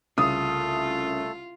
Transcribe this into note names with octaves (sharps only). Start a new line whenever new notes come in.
C2 C#3 A3 F4 A4 A5 D#6